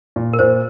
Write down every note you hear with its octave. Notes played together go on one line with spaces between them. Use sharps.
A#2
A#4
A#2 C5